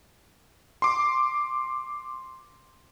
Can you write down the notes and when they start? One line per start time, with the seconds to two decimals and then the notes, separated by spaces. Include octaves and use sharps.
0.82 C6 D6